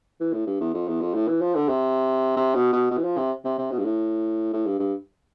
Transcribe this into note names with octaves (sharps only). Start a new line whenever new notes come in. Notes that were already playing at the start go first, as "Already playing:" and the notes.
E3
A2
G2
E2
F2
E2
F2
A2
E3
F3
D3
C3
C3
B2
B2
B2
E3
F3
C3
C3
C3
B2
G2
A2
A2
G2
G2